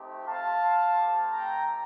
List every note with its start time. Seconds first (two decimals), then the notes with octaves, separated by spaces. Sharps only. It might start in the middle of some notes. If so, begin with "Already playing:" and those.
Already playing: A3 C4 D#4 G4
0.27 C4 F4 F5 A5
0.96 A3 C4 G4
1.31 G5 A#5